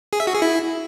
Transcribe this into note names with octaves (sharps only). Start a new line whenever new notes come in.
G#4
E5
F#4
G#4
E4